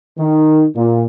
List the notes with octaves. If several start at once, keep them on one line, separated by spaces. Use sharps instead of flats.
D#3
A#2